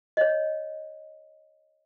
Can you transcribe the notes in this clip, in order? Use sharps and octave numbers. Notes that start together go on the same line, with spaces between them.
C#5 D#5